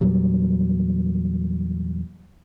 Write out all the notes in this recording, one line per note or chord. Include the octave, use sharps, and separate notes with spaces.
E2 A#2 F#3 G3